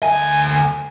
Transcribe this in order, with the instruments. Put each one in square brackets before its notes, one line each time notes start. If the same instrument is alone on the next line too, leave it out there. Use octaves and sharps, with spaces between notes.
[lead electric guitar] D2 G#5